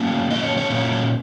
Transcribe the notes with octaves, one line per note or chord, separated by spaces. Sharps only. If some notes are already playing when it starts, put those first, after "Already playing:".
Already playing: A2 F#3 A#3 C#4
A#2 F#3 A#3 C#4 D#5
C#5
C#5
A#2 F#3 A#3 C#4 C#5